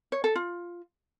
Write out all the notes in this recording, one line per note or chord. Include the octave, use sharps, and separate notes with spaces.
C#5
A4
F4